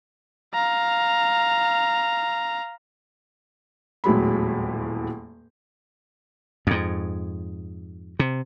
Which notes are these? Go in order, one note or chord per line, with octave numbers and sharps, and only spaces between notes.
F5 A#5
D#1 E2 A2 F#3 G#3 B5
F2 G#2
C3